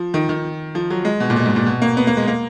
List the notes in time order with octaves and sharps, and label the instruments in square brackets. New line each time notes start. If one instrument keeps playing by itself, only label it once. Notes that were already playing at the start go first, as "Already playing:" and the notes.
Already playing: [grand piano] F3
D#3
D#3
F3
F#3
G#3
B2
A#2
B2
G#2
A#2
B2
A#3
B3
A#3
G#3
A#3